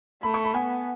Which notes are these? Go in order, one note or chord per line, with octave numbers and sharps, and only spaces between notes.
A3 B5
C#6
B5
B3 G#5